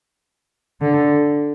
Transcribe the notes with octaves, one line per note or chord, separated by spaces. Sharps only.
D3